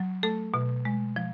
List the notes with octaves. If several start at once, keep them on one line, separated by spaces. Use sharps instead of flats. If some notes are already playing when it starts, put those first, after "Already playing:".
Already playing: F#3
A3 A4
B2
G#3
F3